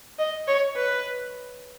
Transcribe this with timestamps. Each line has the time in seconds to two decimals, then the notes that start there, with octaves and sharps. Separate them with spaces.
0.19 D#5
0.48 C#5
0.76 B4